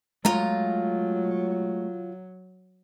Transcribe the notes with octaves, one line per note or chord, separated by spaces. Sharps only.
F#3 G#3 A3 F4 A#5